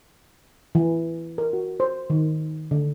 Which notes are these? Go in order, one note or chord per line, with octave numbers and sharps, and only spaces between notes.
E3
A#4
F#4
C5
D#3
D3